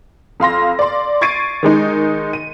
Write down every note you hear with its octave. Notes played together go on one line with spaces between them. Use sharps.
F2 F5 C6 A#6
D5 C6
C#6 G#6 A6 C7 D7 D#7
D#3 G#3 D#4
D#7